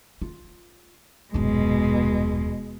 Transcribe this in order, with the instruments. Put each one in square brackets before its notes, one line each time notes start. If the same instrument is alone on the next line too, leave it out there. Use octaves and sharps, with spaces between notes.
[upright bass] F4
[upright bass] D#1 F#2 [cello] B2 G#3